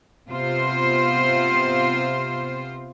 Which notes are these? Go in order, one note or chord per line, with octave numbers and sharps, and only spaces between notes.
C3 B3 F4 C5